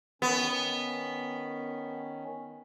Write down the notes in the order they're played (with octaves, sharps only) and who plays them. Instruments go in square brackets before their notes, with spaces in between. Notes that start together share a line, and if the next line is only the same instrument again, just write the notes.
[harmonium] D#3 C#4 [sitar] B3